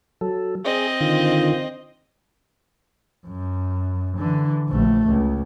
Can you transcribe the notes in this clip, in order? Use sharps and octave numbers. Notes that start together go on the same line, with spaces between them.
F#3 A4
C4 G#4 D#5
D3 D#3 F4
F#2
D3 E3
A#1 A3
C#2